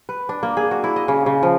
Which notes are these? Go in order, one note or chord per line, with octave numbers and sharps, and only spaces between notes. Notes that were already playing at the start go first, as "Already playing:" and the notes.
B4
D4
A#3
G#4
F#4
E4
D#5
C#3
C#3
F3